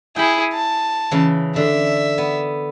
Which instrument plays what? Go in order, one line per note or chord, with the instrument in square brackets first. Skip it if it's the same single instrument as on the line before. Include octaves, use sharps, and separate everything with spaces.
[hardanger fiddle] E4 G#4 [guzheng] G5 B5
[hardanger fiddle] A5
[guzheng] C#3 E3
[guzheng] D3 [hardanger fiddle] E5
[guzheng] B3